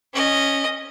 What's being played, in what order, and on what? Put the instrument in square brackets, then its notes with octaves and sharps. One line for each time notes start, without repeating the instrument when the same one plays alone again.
[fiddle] C#4 D#5